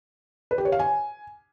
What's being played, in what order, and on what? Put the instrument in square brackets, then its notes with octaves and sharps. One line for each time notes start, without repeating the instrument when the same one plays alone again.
[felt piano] B4
G4
C#5
F5
G#5